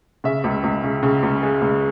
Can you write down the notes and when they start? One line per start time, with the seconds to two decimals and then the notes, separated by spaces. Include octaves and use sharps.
0.24 C#3 E5
0.44 C#2
0.64 C#2
0.83 C#3
1.03 C#3
1.23 C#2
1.43 G#3
1.62 C#2